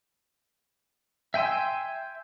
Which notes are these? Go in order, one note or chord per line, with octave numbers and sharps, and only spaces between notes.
E5 G5 G#5 C6 E6